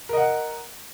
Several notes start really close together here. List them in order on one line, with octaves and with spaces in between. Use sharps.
A#4 D#5 F#5